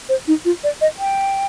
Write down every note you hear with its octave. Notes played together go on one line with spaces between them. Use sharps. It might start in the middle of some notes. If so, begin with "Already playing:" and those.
C5
D#4
F4
D5
D#5
G5